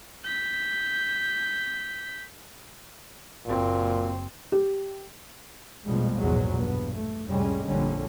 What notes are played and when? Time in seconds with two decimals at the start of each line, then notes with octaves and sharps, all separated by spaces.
0.24 G6 B6
3.46 F#1 A#2 C4
4.52 G4
5.85 A#1 F2 B2 F3 G3 G#3
6.19 A#1 E2 G#2 B2 F#3 G#3
6.57 G2 B3
6.95 A3
7.27 C2 F2 A2 G3 G#3 C#4
7.65 A#1 F2 D3 G3 C#4